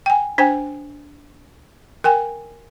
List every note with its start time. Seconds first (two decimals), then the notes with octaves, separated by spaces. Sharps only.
0.06 G5 G#5
0.38 D4 C5 G5 G#5
2.04 A#4 G5 G#5